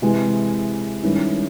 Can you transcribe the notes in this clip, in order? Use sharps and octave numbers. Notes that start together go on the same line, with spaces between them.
C3 E3 G#3
G2 D#3 G#3 C#4 E4